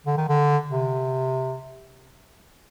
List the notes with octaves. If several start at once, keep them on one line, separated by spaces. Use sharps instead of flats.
D3
D#3
D3
C3